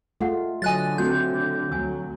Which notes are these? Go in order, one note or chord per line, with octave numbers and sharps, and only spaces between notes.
G#3 A3 F4 A4 F#5
D3 F#3 D#5 G#5 F#6 A6
A3 C4 D4 F#4 G6
D2 F#3 G#5 E6